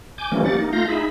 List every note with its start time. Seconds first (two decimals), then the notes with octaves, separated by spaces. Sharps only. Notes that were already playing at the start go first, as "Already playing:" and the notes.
0.18 G#5 D6 G6
0.32 E3 F3 G3 A3 A#3 C#4
0.45 A#3 G4 F#5 A6
0.58 A#3 D#4
0.73 A3 F4 F5 G6 A#6
0.88 D#4 G#4 E5 B5